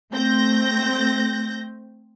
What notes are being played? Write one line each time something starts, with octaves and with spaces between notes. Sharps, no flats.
A3 C4 G6 A#6